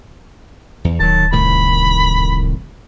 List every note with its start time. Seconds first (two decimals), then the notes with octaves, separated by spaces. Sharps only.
0.84 E2
0.99 D1 D#3 F#3 A5
1.33 C2 A2 D#3 B5